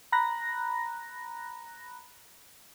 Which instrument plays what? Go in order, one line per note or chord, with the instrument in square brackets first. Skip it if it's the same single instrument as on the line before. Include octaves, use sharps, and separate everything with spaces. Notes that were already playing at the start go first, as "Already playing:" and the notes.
[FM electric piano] A#5 B5 F#6 A#6